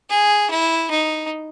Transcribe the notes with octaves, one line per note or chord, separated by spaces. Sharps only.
G#4
E4
D#4